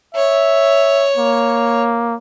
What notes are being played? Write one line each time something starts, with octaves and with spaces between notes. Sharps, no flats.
C#5 E5
A#3